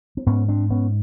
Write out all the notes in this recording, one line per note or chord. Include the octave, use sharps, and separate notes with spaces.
C4
G#2 B3 C#4
C4 D4
B3 C#4